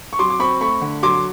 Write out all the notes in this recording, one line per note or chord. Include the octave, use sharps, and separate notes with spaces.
C#6
F#3 C6 D6
D6
C4 B5 C#6
A3 B5 C#6
D3
F#3 C6 D6